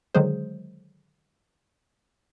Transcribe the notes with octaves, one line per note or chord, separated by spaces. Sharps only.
D3 D#3 F#3 G#3 G#4 C5